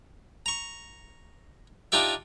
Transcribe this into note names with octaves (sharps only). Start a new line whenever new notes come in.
A#5 C#6
D4 D#4 F4 G4 D5 E5